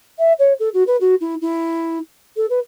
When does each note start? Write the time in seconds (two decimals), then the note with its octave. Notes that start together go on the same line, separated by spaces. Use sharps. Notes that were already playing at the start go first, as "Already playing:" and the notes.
0.18 E5
0.39 C#5
0.59 A4
0.73 F#4
0.87 B4
1.00 F#4
1.20 E4
1.41 E4
2.36 A4
2.50 B4